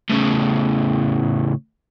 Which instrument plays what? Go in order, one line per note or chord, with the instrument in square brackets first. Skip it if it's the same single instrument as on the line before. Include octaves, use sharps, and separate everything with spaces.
[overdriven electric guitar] A2 C#3